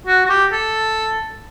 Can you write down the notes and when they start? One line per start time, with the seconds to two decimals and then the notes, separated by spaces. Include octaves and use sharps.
0.07 F#4
0.25 F#4
0.29 G4
0.52 A4